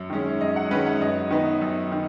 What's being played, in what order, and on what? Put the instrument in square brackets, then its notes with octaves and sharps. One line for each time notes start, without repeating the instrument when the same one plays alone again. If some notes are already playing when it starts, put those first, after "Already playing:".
Already playing: [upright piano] F#2
D#3 G#3 C#4
F#2 D#5
F#5
D#3 G#3 C#4 B4
F#5
F#2 D#5
D#3 B3 D#4
F#2
D#3